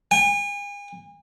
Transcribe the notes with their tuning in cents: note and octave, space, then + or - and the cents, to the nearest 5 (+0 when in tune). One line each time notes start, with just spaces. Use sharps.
G#5 -40